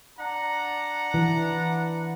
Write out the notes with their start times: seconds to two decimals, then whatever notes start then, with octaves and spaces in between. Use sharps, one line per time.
0.18 D4 F#5 A#5
1.14 E3